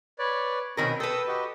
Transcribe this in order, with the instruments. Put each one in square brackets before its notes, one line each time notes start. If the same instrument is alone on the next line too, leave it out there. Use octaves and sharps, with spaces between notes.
[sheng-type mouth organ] B4 C#5 D5
[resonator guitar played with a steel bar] B2 D#3 A#4 [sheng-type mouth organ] C4 C#4 B5
[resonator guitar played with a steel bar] A4 B4 [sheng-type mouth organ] G5 D#6 E6
[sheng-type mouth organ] F#4 G4 D#5